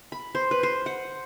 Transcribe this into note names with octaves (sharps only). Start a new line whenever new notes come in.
B5
C5
B4
C5
F#5